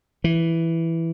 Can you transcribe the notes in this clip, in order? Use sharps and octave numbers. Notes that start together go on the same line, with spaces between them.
E3